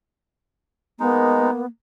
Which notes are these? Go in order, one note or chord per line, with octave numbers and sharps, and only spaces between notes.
G#3 A#3 B3 D#4